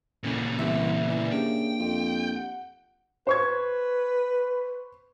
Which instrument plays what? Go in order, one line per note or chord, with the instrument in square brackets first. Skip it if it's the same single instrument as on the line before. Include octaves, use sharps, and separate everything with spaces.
[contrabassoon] A1 [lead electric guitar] A#2 C#3
[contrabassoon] C2 [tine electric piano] E3 B3 [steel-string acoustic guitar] E5
[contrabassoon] E3 [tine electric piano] D5
[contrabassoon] C#3 [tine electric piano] A#3 D4 G4 [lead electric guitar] G5
[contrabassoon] F2
[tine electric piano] F#5
[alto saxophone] B4 [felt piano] C5 C#6 G#6